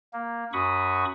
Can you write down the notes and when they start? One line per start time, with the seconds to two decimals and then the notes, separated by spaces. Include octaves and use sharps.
0.13 A#3
0.53 F#2 F#4 B5 C#6 D#6